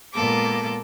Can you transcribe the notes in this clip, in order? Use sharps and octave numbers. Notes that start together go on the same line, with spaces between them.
A#2 G#3 A#3 B3 A4 D6